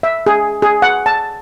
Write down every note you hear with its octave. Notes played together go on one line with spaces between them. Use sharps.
E5
G#4
G#4
F#5
A5